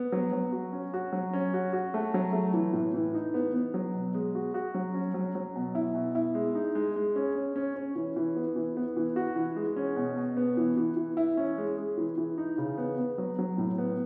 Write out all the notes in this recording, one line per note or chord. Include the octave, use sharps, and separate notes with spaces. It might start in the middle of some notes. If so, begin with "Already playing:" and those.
Already playing: B3
F#3
F#3
F#4
C#4
F#4
F#3
C#4
F#4
F#4
A3
F#3
A3
E3
A2
E3
D#4
B3
B3
F#3
B2
G#3
F#4
F#4
F#3
C#4
F#3
F#3
B2
E4
B2
E4
G#3
D#4
G#3
G#3
C#4
C#4
C#4
C#4
E3
E3
B3
E3
B3
E3
F#4
E3
G#3
C#4
B2
B2
B3
E3
E3
E3
E4
C#4
G#3
G#3
E3
E3
D#4
C#3
B3
B3
F#3
F#3
A2
B3